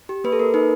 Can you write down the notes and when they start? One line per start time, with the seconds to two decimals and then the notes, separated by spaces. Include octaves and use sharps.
0.09 G4
0.24 A#3 B4
0.32 A4
0.39 A#3 A#4
0.54 D#4 B4